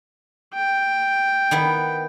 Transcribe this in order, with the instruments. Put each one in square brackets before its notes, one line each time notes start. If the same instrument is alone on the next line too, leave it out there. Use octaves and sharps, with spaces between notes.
[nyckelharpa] G5
[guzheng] D#3 B3 E4